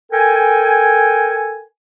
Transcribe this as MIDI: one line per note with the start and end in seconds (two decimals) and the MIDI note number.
0.12 1.63 69
0.12 1.63 70
0.12 1.63 79
0.12 1.63 80